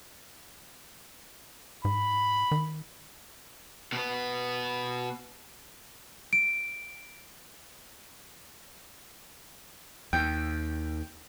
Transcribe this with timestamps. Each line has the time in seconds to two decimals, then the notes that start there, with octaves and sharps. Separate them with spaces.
1.85 G#2 B5
2.51 D#3
3.92 B2 B3
6.33 D7
10.13 D#2 G5